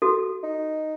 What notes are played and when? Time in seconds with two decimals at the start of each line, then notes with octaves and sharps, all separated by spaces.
0.02 F#4 A4
0.43 D#4